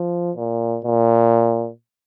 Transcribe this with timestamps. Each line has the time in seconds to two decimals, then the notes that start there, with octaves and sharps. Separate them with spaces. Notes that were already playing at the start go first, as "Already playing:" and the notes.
Already playing: F3
0.36 A#2
0.84 A#2